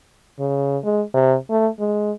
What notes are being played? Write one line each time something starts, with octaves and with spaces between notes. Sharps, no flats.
C#3
G#3
C3
A3
G#3